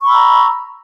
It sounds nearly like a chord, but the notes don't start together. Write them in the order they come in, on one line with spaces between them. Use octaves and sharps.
C#6 B5 E6 A#5